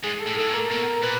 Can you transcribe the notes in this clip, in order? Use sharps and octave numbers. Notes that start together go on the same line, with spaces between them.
G#2 G#4
A4
A2
A2 A4
A#2
A#4
B2 A#4
A#2 B4